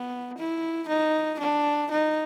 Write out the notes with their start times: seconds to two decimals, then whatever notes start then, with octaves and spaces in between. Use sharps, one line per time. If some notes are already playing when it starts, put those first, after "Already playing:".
Already playing: B3
0.37 E4
0.88 D#4
1.39 D4
1.91 D#4